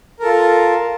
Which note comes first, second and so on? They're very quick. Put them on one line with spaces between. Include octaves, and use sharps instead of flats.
A#4 A4 F4